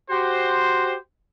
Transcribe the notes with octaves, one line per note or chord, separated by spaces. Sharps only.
F#4 G4 C5